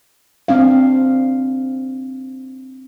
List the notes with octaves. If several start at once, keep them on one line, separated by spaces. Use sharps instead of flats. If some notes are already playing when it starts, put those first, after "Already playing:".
C4 D4 F5